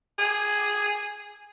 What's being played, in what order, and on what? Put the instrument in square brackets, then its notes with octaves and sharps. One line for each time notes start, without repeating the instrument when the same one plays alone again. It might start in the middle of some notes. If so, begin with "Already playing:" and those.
[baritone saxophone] G#4